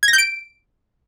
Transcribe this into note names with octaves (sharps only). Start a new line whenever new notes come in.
G#6
A#6
G6
D7